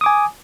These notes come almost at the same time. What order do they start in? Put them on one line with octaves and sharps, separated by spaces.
D#6 D6 G#5